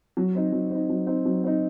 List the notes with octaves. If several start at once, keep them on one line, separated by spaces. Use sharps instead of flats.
F#3
C4 D#4
F#3
C4 D#4
F#3
C4 D#4
F#3
C4 D#4